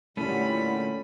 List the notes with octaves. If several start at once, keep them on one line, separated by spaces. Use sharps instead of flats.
A#2 D3 G3 A3 C#4 E4 B5